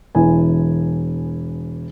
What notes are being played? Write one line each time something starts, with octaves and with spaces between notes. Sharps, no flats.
E1 E3 G#5